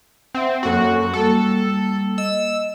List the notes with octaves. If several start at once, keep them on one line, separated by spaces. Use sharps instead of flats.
C4 E5 F#5
F#2 A#3 F#4 A4
G3 A#3 A4
D#5 E6